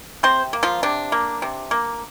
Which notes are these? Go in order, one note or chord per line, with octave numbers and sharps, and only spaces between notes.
C3 C4 C5
A#3
F3 F4
C3 D4
A#3
C3
A#3